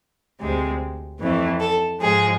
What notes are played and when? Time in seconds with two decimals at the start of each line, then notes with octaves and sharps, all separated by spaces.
0.40 D2 C3 G#3 C4
1.19 F2 E3 A3 C4
1.60 A4
2.00 G#2 F3 G#3 G#4